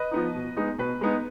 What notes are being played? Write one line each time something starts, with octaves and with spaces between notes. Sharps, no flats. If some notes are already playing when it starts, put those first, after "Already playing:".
Already playing: B4 D#5
F3 B3 D#4
B2
G#3 B3 D#4
B2 B4
G#3 B3 D#4